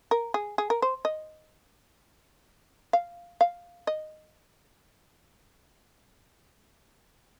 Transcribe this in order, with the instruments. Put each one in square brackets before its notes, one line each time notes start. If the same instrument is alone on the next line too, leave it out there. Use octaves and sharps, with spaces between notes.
[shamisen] A#4
G#4
G#4
A#4
C5
D#5
F5
F5
D#5